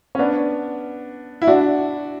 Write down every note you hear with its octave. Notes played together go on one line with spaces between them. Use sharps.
C#4
B3 D4
E4
D4 F#4